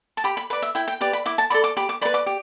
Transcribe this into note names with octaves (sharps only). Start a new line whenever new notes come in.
A5
G4 B5
B5
B4 D5 B5
E5
E4 G5
G5
G4 B4 D5
B5
E4 D6
A5
A4 D5 B5
D6
G4 B5
D6
B4 D5 B5
D6
G4